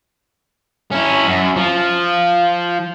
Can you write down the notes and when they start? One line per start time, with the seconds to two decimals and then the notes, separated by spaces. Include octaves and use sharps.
0.92 C#4 E4
1.27 F#2
1.57 F3